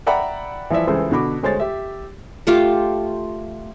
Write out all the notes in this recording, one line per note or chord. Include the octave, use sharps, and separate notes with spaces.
D5 E5 F#5 G5 A#5 B5
E3 F3 E4 D5 E5
C#2 E3 G#4 A4 C5
B2 D3 F#4 B5 D6
D2 G#3 C5 C#5 A6
G4 E5
A3 F4 G4